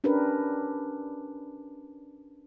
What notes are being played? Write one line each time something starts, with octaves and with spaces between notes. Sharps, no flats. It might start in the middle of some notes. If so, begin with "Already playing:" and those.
C#4 D4 G4 A#4 B4